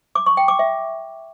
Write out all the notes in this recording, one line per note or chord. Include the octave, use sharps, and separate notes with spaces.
D6
C#6
G5
D6
E5